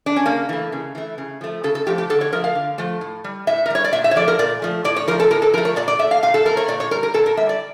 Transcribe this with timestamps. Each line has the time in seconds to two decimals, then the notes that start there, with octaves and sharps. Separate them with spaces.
0.06 D4
0.16 C#4
0.26 C#3 A#3
0.49 E3 A3
0.72 C#3
0.95 E3 A3
1.18 C#3
1.41 F3 A3
1.64 C#3 A4
1.75 A4
1.86 F3 A3 G4
1.98 G4
2.09 D3 A4
2.21 C#5
2.32 F3 A3 A#4
2.44 F5
2.55 D3
2.78 F3 A3
3.01 A2
3.24 G3
3.47 A2 E5
3.66 A#4
3.70 G3 C#5
3.84 D5
3.93 A#2 E5
4.04 E5
4.11 C#5
4.16 F3 A3 D5
4.28 A#4
4.39 A#2 D5
4.62 F3 A3
4.84 A2 D5
4.96 C#5
5.07 F3 A#4
5.11 A3
5.20 A4
5.31 A2 A#4
5.42 A4
5.53 F3 A#4
5.58 A3
5.65 C#5
5.76 A#2 D5
5.88 D5
5.99 A3 E5
6.11 F5
6.23 A#2 F5
6.34 A4
6.45 A3 A#4
6.57 C#5
6.68 A#2 D5
6.80 C#5
6.91 G3 A#4
7.03 A#4
7.14 A#2 A4
7.26 A#4
7.37 G3 E5
7.49 D5